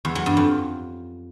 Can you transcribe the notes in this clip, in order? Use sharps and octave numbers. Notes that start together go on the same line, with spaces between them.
E2
F#3
G2
F2